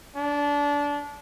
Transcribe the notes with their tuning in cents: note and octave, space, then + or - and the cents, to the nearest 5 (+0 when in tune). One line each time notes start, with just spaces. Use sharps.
D4 -25